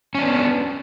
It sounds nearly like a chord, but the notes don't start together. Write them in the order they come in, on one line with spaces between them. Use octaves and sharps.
C#4 D4 B3